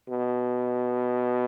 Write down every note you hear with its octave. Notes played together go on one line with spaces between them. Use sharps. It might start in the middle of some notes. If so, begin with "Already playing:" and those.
B2